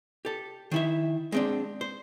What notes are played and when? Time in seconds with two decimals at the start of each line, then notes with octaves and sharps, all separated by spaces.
0.25 G4 A4
0.71 D#3 E4 E5
1.32 G#3 C4 D4
1.81 C5